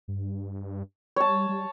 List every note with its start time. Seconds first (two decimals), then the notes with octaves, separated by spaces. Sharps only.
0.08 G2
1.16 G3 C#5 A5
1.49 G3